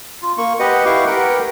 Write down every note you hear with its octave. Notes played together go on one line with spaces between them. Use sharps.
F4
A#3 C#6
G4 B4 D#5 F#5
E4 G4 B4 F5 C#6 D6
G4 A#4 B4 F#5 G5